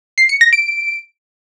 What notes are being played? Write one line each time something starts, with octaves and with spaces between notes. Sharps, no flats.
C7
C#7
A#6
D7